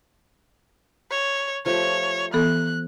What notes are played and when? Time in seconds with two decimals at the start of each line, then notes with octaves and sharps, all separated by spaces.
1.11 C#5
1.66 F3 A3 G4 C#5
2.34 E3 B3 A4 F#6